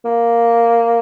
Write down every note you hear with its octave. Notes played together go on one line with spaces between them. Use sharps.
A#3